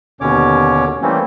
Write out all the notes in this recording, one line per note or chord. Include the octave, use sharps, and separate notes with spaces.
D#2 B2 D3 C#4 C#5 D6
E3 G3 A3 A#3 C4 C#4